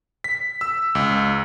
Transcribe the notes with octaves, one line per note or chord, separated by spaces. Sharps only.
B6
E6
C#2